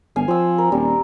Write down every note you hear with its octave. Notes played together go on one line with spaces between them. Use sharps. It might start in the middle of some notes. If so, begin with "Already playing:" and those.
G1 F5 G#5
F3 C4 E6
A#4
D#1 G3